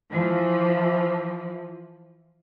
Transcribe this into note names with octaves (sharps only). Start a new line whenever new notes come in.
E3 F3